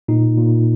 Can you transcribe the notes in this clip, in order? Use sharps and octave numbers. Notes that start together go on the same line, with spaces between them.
A#2 D#4
A#2